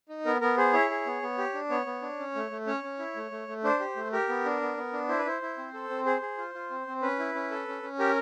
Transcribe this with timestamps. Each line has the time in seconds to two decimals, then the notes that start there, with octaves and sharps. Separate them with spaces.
0.09 D#4
0.25 B3 A#4
0.41 B3 A#4
0.57 G#4 C5
0.73 E4 C#5
0.90 G#4
1.06 B3
1.22 B3
1.38 G4
1.54 D4
1.70 B3 C#5
1.86 B3
2.02 D4
2.19 C#4
2.35 A3
2.51 A3
2.67 C#4 C#5
2.84 C#4
2.99 E4
3.16 A3
3.31 A3
3.48 A3
3.64 D4 C5
3.80 G4
3.96 A3
4.12 G4 A#4
4.29 B3
4.45 D4
4.61 B3
4.77 B3
4.93 D4
5.08 E4 C5
5.19 B4
5.25 E4 C5
5.42 E4
5.58 C4
5.74 A4
5.90 C4
6.06 G#4 C5
6.22 G#4
6.38 F4
6.54 F4
6.70 C4
6.87 C4
7.02 C#4 B4
7.19 E4
7.35 C#4
7.51 A4
7.68 C#4
7.83 C#4
7.99 G4 A#4